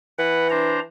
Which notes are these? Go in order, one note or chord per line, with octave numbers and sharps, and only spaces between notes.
E3 B4 F#5
D4 C5 A#5